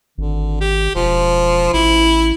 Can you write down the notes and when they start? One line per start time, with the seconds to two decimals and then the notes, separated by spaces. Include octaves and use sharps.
0.18 G#1 D3
0.61 G4
0.95 E1 F3
1.73 A1 E4